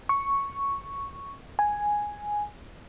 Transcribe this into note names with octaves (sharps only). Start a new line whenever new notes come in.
C#6
G#5